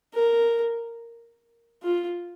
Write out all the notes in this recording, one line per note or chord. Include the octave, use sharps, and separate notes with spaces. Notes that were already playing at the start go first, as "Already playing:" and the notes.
A#4
F4